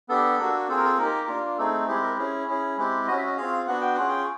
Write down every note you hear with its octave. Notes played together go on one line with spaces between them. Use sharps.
B3 D4 G4 A4
A#3 D4 F#4
C4 F4 G#4 A4
A#4
A4
A#3 D#4 G4 A#4
A#3 D4 F4
A3 C4 D#4 G#4 A4
G#3 C4 E4 G4 G#4
A#4
C#4 E4 G#4
C#4 E4 G#4
G#3 C4 E4 G4
C#4 F#4 D#5
E5
D#5
C4 F4 G#4 F5
B3 D4 F#4 F#5
G5
C#4 F4 G#4 F#5
G5